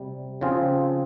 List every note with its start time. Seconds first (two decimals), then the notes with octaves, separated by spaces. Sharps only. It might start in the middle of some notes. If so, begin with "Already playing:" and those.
Already playing: C3 G3
0.41 C#3 F3 C4 F4 G#4